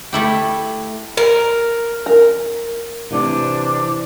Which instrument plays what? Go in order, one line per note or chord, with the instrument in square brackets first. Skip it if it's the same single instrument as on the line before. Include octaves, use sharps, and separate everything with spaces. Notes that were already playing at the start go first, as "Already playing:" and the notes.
[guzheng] A3 E4 G4
[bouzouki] A#4
[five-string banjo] A#4
[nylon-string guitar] C3 E3 [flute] D4